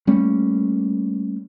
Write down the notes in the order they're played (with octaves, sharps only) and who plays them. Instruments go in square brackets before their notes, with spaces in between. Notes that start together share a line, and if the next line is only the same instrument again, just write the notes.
[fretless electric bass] G3 A3 A#3 C#4